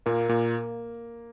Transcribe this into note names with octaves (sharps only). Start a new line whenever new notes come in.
A#2 A#3
A#2